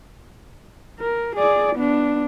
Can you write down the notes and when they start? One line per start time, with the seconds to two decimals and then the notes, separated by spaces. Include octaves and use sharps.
1.00 A#4
1.35 G#4 D5
1.75 B3 D4